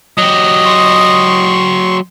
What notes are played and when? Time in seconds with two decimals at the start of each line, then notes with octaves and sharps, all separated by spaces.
0.18 F#3 G4 D#5
0.65 C6 C#6